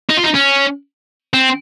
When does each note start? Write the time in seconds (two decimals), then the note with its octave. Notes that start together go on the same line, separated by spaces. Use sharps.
0.10 D#4
0.18 F4
0.24 D#4
0.35 C#4
1.34 C4